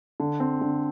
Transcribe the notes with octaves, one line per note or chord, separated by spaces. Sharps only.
D3
C4
D3